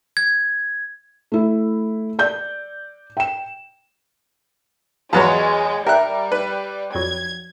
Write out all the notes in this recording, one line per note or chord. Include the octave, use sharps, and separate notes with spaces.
G#6
A3 E4
D5 G6
G5 E7
E2 F#3 G#3 F4 G#4 B4 C#5
G3 G4 A#4 E5 G5 F#6
B4
F2 F#3 G#6